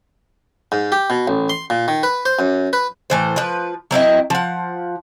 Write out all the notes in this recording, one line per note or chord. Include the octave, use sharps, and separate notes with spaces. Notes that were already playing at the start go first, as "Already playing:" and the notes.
G#2
G4
B2
A1
C6
A#2
D#3
B4
C5
F#2
B4
A2 E3 C5
F3 B4
F#3 C4 E4 D#5
F3 F#5